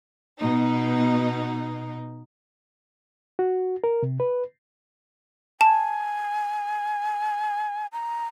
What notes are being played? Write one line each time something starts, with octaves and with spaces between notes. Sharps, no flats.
B2 D#4
F#4
A#4
C3
B4
G#5 A5
A#5